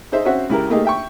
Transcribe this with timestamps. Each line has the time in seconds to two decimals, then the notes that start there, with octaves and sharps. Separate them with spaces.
0.12 D#4 G#4 C5 E5
0.25 C4 C#4 F#4 C5 E5 F#5
0.49 C#2 E4 G4 A#4
0.70 A3 A#3 D#4 G4 G#4
0.85 E5 G5 C#6